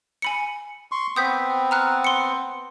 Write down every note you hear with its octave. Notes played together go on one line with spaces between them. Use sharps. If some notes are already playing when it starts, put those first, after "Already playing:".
G#5 B5 C#7
C6 C#6
B3 C4 D#6 G6 B6
A#5 F6 F#6
C6 C#7